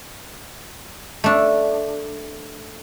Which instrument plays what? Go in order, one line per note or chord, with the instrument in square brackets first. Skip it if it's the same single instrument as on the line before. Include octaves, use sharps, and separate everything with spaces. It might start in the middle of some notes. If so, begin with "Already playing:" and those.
[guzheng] A3 D4